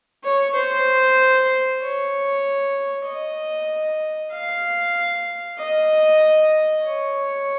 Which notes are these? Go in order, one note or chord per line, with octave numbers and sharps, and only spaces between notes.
C#5
C5
C#5
D#5
F5
D#5
C#5